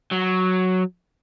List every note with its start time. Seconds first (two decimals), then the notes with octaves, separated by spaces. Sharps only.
0.12 F#3